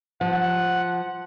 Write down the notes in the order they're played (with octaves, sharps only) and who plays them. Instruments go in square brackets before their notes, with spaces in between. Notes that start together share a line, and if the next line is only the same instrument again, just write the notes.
[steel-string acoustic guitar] F3 [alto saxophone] F#5